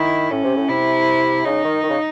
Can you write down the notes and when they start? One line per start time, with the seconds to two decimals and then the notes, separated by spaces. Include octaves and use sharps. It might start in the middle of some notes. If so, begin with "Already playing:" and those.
Already playing: D#3 E4
0.31 A2 C#4
0.44 C3
0.56 A2
0.69 C3 E4
1.45 C#3 D#4
1.64 D#3
1.83 D#3
1.90 C#3